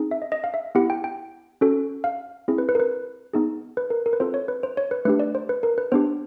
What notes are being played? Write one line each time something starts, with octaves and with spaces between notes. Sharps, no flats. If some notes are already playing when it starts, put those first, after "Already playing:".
Already playing: C4 D#4 G#4
E5
D#5
D#5
F5
E5
B3 E4 G4 F#5
G5
G5
C#4 F#4 A4
F5
C4 E4 G#4
B4
B4
A#4
B4
B3 D#4 G#4
B4
A#4
A#4
B4
C4 F4 A4 C5
C#5
B4
C5
C#5
B4
A3 D4 G4 B4
D5
C5
B4
A#4
B4
B3 D4 G4 C5